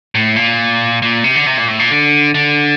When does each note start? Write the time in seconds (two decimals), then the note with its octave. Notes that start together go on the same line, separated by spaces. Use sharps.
0.15 A2
0.36 A#2
1.02 A#2
1.24 C3
1.36 D3
1.46 C3
1.57 A#2
1.68 A2
1.79 A#2
1.90 D3
2.34 D3